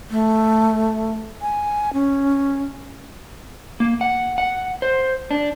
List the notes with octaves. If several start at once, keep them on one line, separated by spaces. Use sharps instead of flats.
A3
G#5
C#4
A#3
F#5
F#5
C5
D4